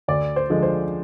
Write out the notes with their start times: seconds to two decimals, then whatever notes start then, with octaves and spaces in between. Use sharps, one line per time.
0.08 D2 D5
0.36 C5
0.50 D3 F3 G#3
0.63 C5